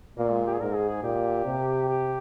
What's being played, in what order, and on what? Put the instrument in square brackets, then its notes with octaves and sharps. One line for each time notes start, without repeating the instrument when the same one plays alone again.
[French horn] A#2 [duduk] A#3
[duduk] G#3
G4
G#4
[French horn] G#2 [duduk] A#4
[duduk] G#4
G#4
[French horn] A#2 [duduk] G4
[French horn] C3
[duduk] G4